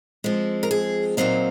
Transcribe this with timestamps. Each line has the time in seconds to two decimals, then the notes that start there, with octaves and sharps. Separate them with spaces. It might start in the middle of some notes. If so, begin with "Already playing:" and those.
0.24 F3 G#3 C4
0.63 A#4
0.71 G#4
1.17 A#2 F#3 C4 D#4 F5